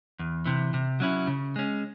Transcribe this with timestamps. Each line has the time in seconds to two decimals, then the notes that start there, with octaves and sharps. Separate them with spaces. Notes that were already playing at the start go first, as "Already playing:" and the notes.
0.19 E2
0.46 C3 E3
0.74 C3
1.00 F#3 C#4 E4
1.27 C#3
1.56 G#3 C#4